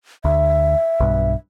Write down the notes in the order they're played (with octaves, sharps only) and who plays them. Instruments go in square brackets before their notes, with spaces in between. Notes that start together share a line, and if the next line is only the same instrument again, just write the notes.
[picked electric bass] D2 [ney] E5
[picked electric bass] B1 G2